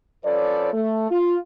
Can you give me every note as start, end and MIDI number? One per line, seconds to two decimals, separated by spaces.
0.24 0.70 53
0.24 0.70 61
0.24 0.70 69
0.24 0.70 71
0.24 0.70 73
0.24 0.70 74
0.73 1.08 57
1.11 1.36 65